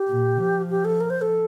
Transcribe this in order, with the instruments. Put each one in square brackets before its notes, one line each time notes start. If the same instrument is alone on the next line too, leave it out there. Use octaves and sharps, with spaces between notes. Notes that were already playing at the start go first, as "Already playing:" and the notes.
Already playing: [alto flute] G4
[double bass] A#2
F3
[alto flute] G4
A4
A#4
C5
A4